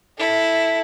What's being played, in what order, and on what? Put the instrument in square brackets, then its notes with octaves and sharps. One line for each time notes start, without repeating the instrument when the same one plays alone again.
[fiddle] E4 A4